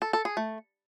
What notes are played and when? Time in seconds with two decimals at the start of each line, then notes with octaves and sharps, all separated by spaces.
0.02 A4
0.13 A4
0.25 G#4
0.37 A3